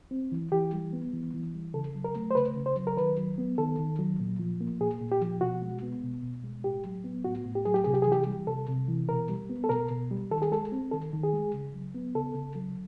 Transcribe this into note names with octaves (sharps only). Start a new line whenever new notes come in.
C4
E3
E3 G4
G3
B3
E3
E3
G3
C#3 A4
F#3
A#4
A3
C5
C#3 B4
C#3
C5
F#3
A#4
D#3 B4
F#3
B3
D#3 A4
D#3
F#3
A#2
F3
A#3
A#2 G#4
A#2
G4
F3
B2 F#4
G#3
B3
B2
B2
G#3
A2 G4
F#3
B3
A2 F#4
A2
G4
F#3 G#4
G4
C3 G#4
G4
E3 G#4
G4
G3
C3 A4
C3
E3
B2 A#4
G3
B3
A4
B2 A#4
B2
G3
D#3 A4
G#4
G#3 A4
C4
D#3 A4
D#3
G#4
G#3
C#3
F#3
B3
C#3 A4
C#3
F#3